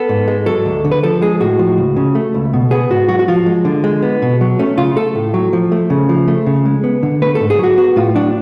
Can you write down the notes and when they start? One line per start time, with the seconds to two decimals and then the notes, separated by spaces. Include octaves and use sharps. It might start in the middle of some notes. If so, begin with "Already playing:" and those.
Already playing: B3 A4
0.09 G#2
0.28 G#3
0.46 F#3 A4
0.66 D2
0.84 D3
0.92 B4
1.03 F3 A4
1.22 G#3 G#4
1.40 A2 F#4
1.59 F3
1.78 C#2
1.96 C#3
2.15 A3
2.34 C#2
2.53 B2
2.71 B3 G#4
2.90 G#2 F#4
3.08 F#3 F#4
3.19 F#4
3.28 F3 F4
3.46 G#3
3.65 D3
3.84 G#3
4.03 B3
4.22 B2
4.41 F#3
4.59 A3 C#4
4.77 C#3 F4
4.96 A3 A4
5.15 A2
5.34 F#3
5.53 F3
5.72 A3
5.90 C#3
6.09 F3
6.28 A3
6.46 C#3
6.66 G#3
6.84 B3
7.03 D3
7.22 A3 B4
7.35 A4
7.40 G#2
7.50 G#4
7.59 F#3 F#4
7.78 B3 F#4
7.96 A2 F4
8.15 F#3 D4